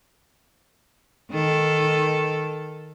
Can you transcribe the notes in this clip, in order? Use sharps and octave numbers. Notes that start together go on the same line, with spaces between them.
D#3 A4